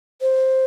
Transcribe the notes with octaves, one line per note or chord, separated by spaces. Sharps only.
C5